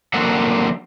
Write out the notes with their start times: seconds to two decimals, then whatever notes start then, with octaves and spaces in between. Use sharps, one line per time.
0.14 D3 F#3 A#3 C4 A4 F#5